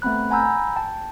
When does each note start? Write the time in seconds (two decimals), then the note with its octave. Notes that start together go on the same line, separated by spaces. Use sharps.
0.02 A3 B3 C4 B5 F#6
0.30 F#5 G#5 A#5 B5 E6 G6
0.76 G5 A5